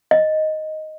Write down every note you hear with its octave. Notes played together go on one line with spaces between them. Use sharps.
D#5